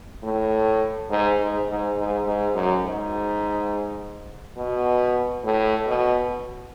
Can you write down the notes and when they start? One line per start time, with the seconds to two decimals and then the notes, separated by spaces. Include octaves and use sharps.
0.23 A2
1.10 G#2
1.40 G#2
1.69 G#2
1.97 G#2
2.26 G#2
2.54 F#2
2.84 G#2
4.57 B2
5.44 A2
5.87 B2